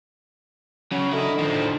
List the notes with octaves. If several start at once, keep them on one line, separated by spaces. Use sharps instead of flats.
C#3 F#3
D3 E4 A#4 D#5
D#3 F3 D#4 C5